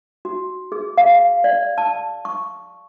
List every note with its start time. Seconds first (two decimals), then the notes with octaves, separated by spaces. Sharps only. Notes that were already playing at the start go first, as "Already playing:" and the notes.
0.25 F#4
0.72 G#4
0.98 F5
1.44 D5
1.78 A5
2.25 C#6